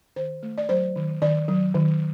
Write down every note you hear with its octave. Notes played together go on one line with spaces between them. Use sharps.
D#3 C5
A3
D5
F#3 C5
D#3
D#3 D5
F#3
D#3